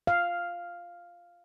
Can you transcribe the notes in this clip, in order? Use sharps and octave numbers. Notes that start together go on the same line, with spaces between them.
F5